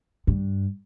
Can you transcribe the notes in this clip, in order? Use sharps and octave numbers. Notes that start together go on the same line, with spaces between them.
G2